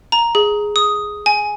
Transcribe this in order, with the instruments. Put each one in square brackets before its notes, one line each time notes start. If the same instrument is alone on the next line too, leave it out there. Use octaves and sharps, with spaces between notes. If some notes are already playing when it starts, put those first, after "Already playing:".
[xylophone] A#5
G#4
D#6
G#5